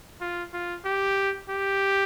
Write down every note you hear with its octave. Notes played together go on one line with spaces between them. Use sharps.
F4
F4
G4
G4